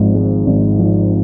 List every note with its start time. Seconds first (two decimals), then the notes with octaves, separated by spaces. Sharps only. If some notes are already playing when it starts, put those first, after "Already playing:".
Already playing: G#1 G#2 F3 G#3
0.14 G#3
0.46 G#1
0.79 F3